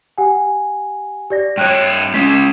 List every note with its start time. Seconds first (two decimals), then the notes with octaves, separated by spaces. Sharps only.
0.18 G4 F#5 G#5
1.30 G4 D5 A#6
1.57 G2 C#5 G5 F#6
2.14 G#3 C#4 B6